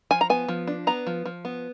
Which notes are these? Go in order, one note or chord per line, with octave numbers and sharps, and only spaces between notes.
F3 G#5
A#5
B3 G#5
F3
D4
B3 A#5
F3
F3
B3